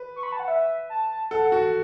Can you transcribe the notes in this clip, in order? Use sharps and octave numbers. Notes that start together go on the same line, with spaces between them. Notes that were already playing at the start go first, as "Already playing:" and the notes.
Already playing: B4
C#6
B5
A5
F#5
E5
A5
A4 F#5
F#4